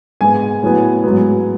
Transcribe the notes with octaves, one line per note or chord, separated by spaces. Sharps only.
G#2 G#3 B3 G#5
A2 F#3 B3
G#2 F#3 B3